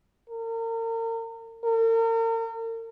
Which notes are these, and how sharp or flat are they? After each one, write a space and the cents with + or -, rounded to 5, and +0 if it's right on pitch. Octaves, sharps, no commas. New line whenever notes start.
A#4 -35
A#4 -40